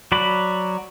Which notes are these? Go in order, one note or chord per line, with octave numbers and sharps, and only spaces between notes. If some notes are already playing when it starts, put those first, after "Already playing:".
F#3 F#4 D5 B5